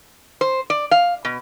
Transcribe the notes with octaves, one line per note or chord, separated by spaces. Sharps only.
C5
D5
F5
B2